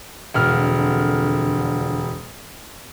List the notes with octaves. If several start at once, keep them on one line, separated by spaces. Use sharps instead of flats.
E1 F2 D3 F6